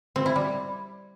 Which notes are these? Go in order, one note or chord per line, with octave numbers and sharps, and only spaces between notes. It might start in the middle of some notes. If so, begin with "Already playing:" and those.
C4
E4
G3